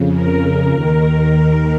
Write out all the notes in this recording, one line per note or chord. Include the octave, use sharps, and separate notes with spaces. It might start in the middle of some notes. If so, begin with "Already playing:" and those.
Already playing: F2 C#3
A#4
A#4
D#2 D#3 A#4